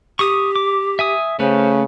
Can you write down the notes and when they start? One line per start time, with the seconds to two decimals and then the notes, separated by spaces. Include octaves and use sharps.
0.19 G4 C#6 D#6
0.56 D6
0.99 E5 G#5 D#6
1.40 C#3 A3 C#4 B4 C5